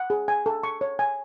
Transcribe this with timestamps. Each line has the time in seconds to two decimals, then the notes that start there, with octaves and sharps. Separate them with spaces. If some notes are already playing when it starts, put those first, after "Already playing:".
Already playing: F#5
0.10 G#4
0.28 G#5
0.46 A4
0.63 C#6
0.81 C#5
0.99 G#5